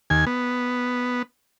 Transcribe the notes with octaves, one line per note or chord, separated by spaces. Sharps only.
D#2 G#5
B3